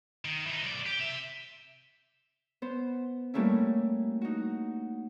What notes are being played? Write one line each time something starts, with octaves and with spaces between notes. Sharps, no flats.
D#3
E3 D#4
B1 D5
G4
C3 E5
B3 C5
G3 A3 A#3 C#4 E4
D#4 F#4